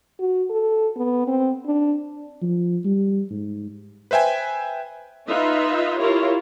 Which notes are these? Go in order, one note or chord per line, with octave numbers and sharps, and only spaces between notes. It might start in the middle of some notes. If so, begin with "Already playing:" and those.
F#4
A4
B3
C4
D4
F3
G3
G#2
B4 C5 E5 G5 G#5
D#4 F4 B4 D#5 E5
E4 F4 G4 A#4 C#5